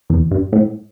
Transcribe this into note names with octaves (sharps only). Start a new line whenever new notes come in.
E2
G2
A2